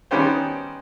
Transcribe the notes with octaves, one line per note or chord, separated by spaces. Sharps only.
D#3 G3 B3 C#4 G4 C5